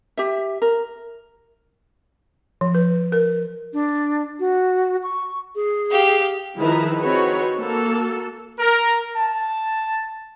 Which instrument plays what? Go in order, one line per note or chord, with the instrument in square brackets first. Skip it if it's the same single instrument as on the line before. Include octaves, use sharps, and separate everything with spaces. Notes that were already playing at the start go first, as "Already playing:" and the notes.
[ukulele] G4 E5
A#4
[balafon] F3
B4
A#4
[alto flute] D4
F#4
C#6
G#4
[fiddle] G4 F5
[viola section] D#3 F3 E4 G#4 B4 A#5
C4 D#4 F#4 G#4 B4 C#5
A#3 F#4 A4
[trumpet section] A#4
A5